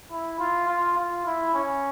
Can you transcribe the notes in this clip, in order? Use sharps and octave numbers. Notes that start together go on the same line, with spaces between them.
E4
F4
F4
F4
E4
C#4